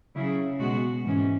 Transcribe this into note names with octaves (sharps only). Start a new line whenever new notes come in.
C#3 F#3 E4 G#4
B2 G#3 B3 F#4
G#2 E3 C#4